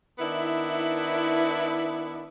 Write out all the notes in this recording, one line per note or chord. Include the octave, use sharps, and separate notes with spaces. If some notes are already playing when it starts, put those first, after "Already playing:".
D#3 B3 D4 E4